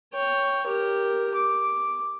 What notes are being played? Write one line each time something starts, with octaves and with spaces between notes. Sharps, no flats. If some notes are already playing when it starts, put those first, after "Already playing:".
C#5 G5
G4 A#4
D6